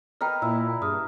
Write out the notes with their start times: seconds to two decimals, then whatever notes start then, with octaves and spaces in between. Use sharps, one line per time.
0.21 A#4 B4 D#5 G5 F6
0.42 A#2 E4 E6
0.82 G2 G#4 D#6 F6